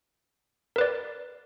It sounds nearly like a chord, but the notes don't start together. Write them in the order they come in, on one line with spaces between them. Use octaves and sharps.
A#4 B4 D5